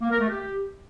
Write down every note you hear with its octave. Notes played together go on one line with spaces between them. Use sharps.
A#3
A#4
A3
G4